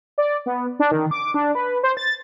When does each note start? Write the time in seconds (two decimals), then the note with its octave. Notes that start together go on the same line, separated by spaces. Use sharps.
0.18 D5
0.46 B3
0.79 D4
0.91 D#3
1.11 D6
1.34 D4
1.55 B4
1.83 C5
1.97 A6